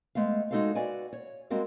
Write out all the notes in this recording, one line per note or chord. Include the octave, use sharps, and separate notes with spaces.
G#3 A3 B3 F5
G#3 D#4 F#4 A4 C5 F5
F#4 B4 D5 F5 G#5
C#5
G3 G#3 C4 F#4 A#4 F5